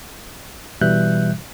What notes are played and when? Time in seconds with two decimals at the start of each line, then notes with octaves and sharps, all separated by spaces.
0.81 B2 E3 G3 E5 F#6 G6